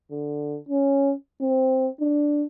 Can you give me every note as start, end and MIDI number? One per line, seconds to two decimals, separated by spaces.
0.11 0.58 50
0.69 1.13 61
1.41 1.89 60
2.00 2.45 62